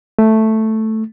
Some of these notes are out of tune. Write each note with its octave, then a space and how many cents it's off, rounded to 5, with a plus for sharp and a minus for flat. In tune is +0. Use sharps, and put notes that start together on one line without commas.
A3 +0